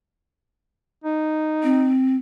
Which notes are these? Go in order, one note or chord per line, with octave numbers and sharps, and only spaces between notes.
D#4
C4